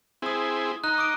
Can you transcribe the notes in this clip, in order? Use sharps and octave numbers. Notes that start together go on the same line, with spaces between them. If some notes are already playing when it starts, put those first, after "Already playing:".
C4 E4 G#4 C6 D#6
D#4 A#5 F#6
D6 D#6 D7